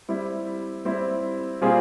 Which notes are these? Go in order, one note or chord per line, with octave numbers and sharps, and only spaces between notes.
G3 C4 E4
G3 C4 E4
A#2 G3 C4 F4 G#4